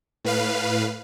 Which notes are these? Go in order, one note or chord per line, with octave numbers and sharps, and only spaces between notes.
A2 B4 F5